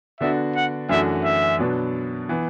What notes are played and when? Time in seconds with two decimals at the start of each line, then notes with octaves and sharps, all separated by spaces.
0.20 D3 B3 D4 F#4 E5
0.55 F#5
0.89 F#2 E3 A3 D4 F#4 E5
1.25 E5
1.59 B2 F#3 D4 B4
2.29 E3 B3